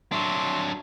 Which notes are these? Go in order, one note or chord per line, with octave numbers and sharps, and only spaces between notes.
F#3 D4 E5 C6